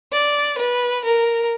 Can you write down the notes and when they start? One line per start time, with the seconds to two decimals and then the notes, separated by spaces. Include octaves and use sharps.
0.12 D5
0.59 B4
1.05 A#4